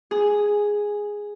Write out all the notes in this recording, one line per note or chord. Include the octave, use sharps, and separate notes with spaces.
G#4